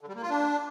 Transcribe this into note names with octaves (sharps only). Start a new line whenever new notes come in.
D3
G3
A#3
F4
D4